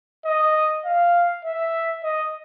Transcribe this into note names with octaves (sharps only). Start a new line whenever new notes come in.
D#5
F5
E5
D#5